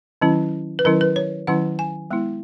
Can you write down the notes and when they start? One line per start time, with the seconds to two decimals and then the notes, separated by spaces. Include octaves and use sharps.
0.22 D#3 F#3 C#4 E4
0.79 B4
0.85 D#3 F#3 C#4 E4 A#4
1.01 B4
1.16 C#5
1.47 D#3 F#3 C#4 E4 F#5
1.79 G#5
2.11 G#3 B3 E4